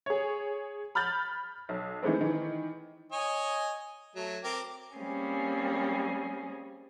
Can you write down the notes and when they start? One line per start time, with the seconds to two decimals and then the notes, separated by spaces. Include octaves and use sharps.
0.06 G#4 C#5
0.95 B5 F6 G6 A6 F#7
1.69 B1
2.03 D#3 E3 G#3 A3 C4
2.21 D#3 E3
3.12 C#5 D#5 G#5
4.16 F#3 A3
4.44 C4 A#4 D6
4.97 G3 A#3 C4 C#4 G#4